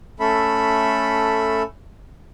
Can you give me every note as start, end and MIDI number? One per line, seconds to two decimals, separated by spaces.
0.20 1.62 57
0.20 1.62 61
0.20 1.62 69
0.20 1.62 76
0.20 1.62 83